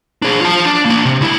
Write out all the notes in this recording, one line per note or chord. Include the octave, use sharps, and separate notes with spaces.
D4 G#4
F4 A5
D4
A#3 D4
C3
C#2 E4